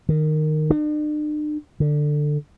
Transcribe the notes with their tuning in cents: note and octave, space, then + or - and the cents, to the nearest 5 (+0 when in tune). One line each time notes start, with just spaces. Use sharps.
D#3 -15
D4 +45
D3 +15